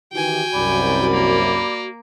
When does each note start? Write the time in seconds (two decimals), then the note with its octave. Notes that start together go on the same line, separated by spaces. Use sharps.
0.13 D#3 E3 F#4 G4 G5 G#5
0.54 C2 F#2 D5 B5
1.11 A#3